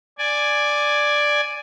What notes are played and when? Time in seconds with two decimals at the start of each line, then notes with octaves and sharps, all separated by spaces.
0.18 D5 G#5